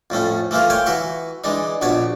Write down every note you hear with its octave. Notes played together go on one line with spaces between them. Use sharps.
F2 A2 A3 C#4
E3 A3 A#3 E4 F4
C#5 F5 G5 G#5 C6
E3 F#4 E5 C#6
E3 G#3 D4 D#4
A#1 B2 B3 D4 C#5